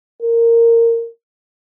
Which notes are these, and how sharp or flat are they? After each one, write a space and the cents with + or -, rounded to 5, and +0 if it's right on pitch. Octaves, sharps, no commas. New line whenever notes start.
A#4 -15